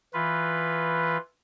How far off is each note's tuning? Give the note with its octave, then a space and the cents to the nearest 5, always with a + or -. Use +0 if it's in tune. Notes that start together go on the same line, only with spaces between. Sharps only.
E3 +0 F4 +0 B4 +0